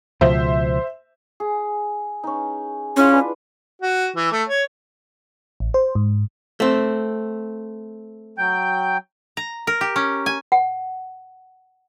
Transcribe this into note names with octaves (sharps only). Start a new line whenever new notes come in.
C#2 B2 F3 C5 E5
G#4
C#4 D#4
G#3 C#4 E4 F4
D4 B4
F#4
E3
A3
C#5
A1
C5
G#2
A3 C4
F#3 G5 G6
A#5
A#4
G4
C#4
G#5
F#5